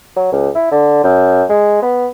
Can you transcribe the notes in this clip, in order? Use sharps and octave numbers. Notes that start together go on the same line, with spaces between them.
F#3
C#2
E4
D3
F#2
G#3
B3